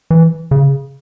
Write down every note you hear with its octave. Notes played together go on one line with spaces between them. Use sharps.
E3
C#3